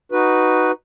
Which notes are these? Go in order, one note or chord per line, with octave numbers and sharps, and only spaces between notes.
D#4 F#4 B4